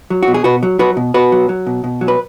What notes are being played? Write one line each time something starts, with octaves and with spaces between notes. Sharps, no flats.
F#3
F#4
B2
G#4
B2 F#4 B4
F#3
F#3 F#4 B4
B2
B2 F#4 B4
F#3
F#3
B2
B2
F#3
B4